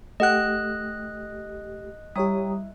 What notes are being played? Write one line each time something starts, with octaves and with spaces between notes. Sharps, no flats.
A3 G4 A4 D#5 F#5 G5 F#6
G3 E4 G4 C#5 A#5 D#6